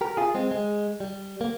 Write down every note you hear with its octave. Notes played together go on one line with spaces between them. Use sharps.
G4 A#4
F4 G#4
G#3 C4
G#3
G3
A#3